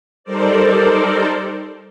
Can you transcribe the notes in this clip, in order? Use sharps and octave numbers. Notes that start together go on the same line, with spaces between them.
G3 D#4 A4 A#4 C5 D5